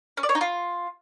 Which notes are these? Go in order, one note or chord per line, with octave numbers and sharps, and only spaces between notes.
C#4
D5
C#5
D#4
F4